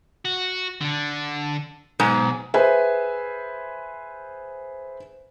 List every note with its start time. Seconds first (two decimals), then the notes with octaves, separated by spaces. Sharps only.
0.25 F#4
0.81 D3 D4
2.00 B1 G#2
2.54 G#4 B4 C5 E5 G#5